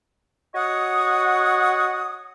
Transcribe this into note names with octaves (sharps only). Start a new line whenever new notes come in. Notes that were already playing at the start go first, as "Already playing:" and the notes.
F#4 C#5 D#5 F#5 C#6 D#6